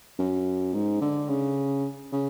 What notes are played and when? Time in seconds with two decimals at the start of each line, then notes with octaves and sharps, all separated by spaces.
0.19 F#2
0.74 G#2
1.01 D3
1.29 C#3
2.12 C#3